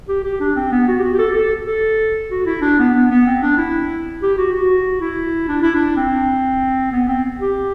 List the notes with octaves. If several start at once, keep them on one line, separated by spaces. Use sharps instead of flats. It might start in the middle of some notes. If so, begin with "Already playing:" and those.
G4
G4
D4
C4
B3
F#4
G4
F#4
G4
A4
G4
A4
A4
F#4
E4
D4
B3
B3
B3
C4
D4
E4
G4
F#4
F#4
E4
D4
E4
D4
C4
B3
C4
G4